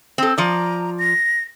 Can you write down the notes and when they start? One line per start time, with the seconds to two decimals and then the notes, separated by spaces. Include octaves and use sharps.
0.18 C4 A4
0.38 F3 D5 A#5
0.99 A#6